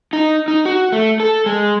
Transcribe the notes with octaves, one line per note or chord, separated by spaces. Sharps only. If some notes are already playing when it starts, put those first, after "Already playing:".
D#4
D#4
F#4
A3
A4
G#3